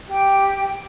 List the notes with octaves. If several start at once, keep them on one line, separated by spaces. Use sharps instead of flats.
G4 G5